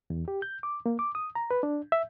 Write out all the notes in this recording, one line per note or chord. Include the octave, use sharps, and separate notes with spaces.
E2
G4
G6
D6
A#3
D6
D#6
A#5
B4
D4
E5